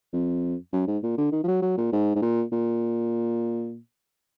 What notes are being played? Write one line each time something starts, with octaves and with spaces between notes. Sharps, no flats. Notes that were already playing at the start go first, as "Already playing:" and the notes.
F2
F#2
G#2
A#2
D3
D#3
F3
F#3
F#3
A#2
G#2
G#2
A#2
A#2